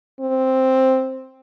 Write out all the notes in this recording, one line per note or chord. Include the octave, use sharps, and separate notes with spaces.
C4